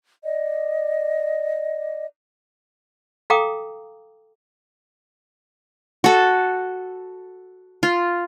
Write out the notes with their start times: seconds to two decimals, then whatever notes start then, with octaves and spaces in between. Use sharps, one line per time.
0.24 D5 D#5
3.30 A4 F5 G5 A#5 D6 D#6
6.04 F#4 A4
7.83 F4